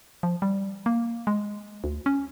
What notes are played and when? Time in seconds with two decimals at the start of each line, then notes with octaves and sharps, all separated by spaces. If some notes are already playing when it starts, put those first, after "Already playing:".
0.23 F3
0.42 G3
0.86 A#3
1.27 G#3
1.84 D2
2.06 C#4